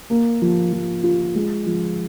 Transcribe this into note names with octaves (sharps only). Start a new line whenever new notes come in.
A#3
F3
F3
F4
G#3
F3